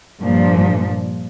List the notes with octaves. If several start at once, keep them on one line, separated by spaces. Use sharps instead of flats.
G2 A#2 F3